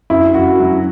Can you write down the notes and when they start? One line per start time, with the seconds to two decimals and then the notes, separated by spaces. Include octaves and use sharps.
0.10 F#2 E4
0.34 F#2 F#4
0.60 F#3 E4